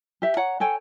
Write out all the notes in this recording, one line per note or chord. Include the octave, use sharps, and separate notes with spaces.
G4 E5
C#5 F#5 A#5
A4 C#5 G5 G#5